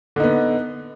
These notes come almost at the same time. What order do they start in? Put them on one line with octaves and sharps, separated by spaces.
D3 D#4 B3